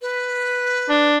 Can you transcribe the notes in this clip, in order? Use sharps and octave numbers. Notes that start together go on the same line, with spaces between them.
B4
D4